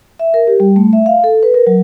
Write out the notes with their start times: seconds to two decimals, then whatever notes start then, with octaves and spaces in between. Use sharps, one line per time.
0.19 E5
0.34 A#4
0.47 G4
0.60 G3
0.76 A3
0.93 E5
1.06 F5
1.24 A4
1.43 B4
1.54 A#4
1.67 F#3